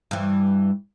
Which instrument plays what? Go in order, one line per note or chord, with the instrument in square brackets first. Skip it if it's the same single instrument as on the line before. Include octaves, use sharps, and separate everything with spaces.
[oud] G2 E3